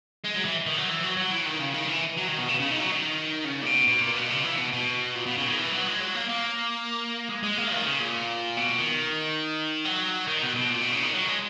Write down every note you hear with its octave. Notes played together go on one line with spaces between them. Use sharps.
G#3
F#3
E3
D#3
F#3
E3
F#3
F#3
E3
D#3
C#3
D#3
E3
F#3
D#3
B2
C#3
C#3
D#3
F#3
D#3
C#3
A#2
B2
B2
A#2
B2
C#3
E3
B2
B2
A#2
B2
C#3
D#3
E3
F#3
G#3
F#3
A#3
A#3
G#3
G#3
A#3
D#3
C#3
A#2
B2
D#3
F#3
D#3
B2
B2
A#2
B2
C#3
D#3
F#3
G#3